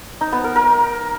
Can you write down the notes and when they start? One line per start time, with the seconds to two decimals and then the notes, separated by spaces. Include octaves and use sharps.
0.21 D#4
0.32 B3
0.44 A#4
0.56 A#4